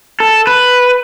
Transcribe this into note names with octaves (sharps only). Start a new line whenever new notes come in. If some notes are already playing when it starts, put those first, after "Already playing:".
A4
B4